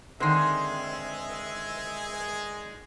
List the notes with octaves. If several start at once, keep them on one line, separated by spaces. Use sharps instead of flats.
D3 D#3 G#3 C4 G#4 E5 C6